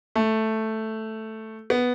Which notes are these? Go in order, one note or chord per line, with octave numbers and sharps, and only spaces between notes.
A3
B3